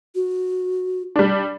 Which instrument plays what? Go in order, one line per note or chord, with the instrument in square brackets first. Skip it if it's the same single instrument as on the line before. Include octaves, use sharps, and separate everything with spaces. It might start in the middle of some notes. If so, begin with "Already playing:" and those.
[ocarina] F#4
[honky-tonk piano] G3 D4